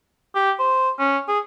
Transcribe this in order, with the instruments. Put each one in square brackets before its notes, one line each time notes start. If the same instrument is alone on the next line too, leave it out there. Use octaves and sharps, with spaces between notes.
[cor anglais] G4
C5
C#4
G#4